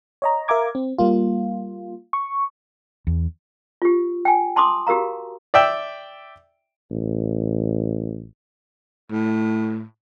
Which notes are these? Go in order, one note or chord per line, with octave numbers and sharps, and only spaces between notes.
C#5 D#5 A#5
A#4 E5 F5 A#5 D6 G#6
C4
G3 A#3 F4
C#6
E2
F4 G4
G5 G#5
A5 B5 C6 D6 D#6
F#4 G4 A#4 F5 A#5
D5 E5 G5 E6
A1
A2